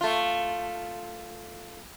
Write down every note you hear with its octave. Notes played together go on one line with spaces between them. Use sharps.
A3 F4